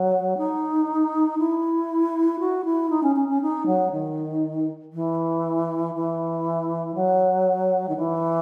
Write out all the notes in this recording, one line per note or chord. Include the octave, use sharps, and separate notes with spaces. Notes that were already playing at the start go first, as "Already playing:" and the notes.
Already playing: F#3
D#4
E4
F#4
E4
D#4
C#4
C#4
C#4
D#4
F#3
D#3
E3
E3
F#3
D#3
E3